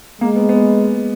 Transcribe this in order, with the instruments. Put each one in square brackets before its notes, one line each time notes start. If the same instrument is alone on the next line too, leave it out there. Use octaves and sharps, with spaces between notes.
[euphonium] G#3 [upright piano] A#3
[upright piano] B3
B3